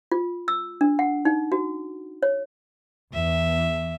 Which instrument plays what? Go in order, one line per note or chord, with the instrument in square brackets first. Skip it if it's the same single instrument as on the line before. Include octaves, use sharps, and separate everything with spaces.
[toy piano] F4
E6
D4
F#5
D#4
F#4
C#5
[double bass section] E2 [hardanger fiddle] E5